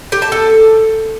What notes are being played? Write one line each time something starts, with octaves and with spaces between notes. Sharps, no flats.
G4
A5
A4